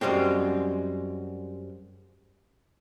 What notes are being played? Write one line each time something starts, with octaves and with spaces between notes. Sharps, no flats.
F#2 G3 G#3 C4